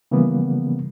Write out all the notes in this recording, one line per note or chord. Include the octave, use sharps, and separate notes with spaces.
C#3 E3 F3 G3 A#3 B3